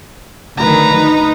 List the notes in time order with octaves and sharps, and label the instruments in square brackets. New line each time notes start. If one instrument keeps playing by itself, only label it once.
[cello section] D2 D#3 [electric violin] B4 A#5
[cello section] D#4